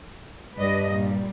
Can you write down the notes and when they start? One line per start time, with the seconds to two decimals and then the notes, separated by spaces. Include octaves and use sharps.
0.58 G2 B4 D5 D#5
0.92 A#2 G3